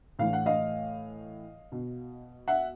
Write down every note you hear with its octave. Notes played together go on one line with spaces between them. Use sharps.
A2 E3 F5
F#5
D#5 F5
B2
E5 F#5